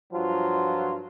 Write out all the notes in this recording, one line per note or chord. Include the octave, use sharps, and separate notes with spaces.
G2 F3 F#3 F4